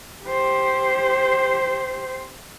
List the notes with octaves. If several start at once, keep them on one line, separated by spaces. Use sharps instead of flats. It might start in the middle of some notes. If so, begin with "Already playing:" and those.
G4 C5